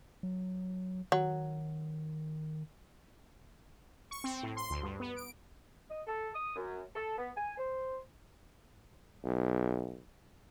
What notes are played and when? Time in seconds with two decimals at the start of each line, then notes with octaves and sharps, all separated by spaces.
0.23 F#3
1.12 D#3 F#3
4.11 C#6
4.24 C4
4.43 A2
4.57 C6
4.70 D2
4.83 G2
5.00 B3
5.16 D7
5.90 D#5
6.07 A4
6.34 D#6
6.56 F#2
6.95 A4
7.18 B3
7.36 G#5
7.58 C5
9.24 B1